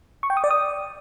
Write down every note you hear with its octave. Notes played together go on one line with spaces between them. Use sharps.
C#6
G5
D#6
D5
D#6